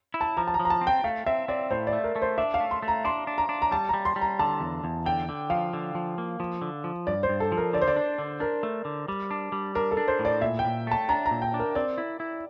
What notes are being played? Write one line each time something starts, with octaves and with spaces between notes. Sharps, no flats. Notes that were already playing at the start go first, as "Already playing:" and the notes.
E4
A5
F3 A#5
A5
A#5
F3
A#5
A5
C4
G5
A3 F5
C4 E5
C4 D5
A2 C5
D5
A3
A#4
A3
C5
D4 E5
F5
A3
C6
A3
A#5
D4 C6
D4
A#5
D4
A#5
G3 A5
G3 A#5
C6
G3
A#5
D3 A5
E2
E2
D3 G5
D3
F3 F5
D3
F3
A#3
F3
D3
F3
G2 D5
C5
G2
A4
F3
A#4
D3 D5
C5
D5
D4
D3
D4 A#4
A3
D3
G3
D4
G3
D4 A#4
A4
D4
C5
A2
D5
A#2 E5
G5
A#2
A3 A5
D4 A#5
A#5
A#2
G5
D4
A#4
C4 D5
E4
E4